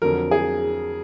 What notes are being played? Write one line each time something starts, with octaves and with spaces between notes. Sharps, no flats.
F2 D3 F#3 A#4
G#4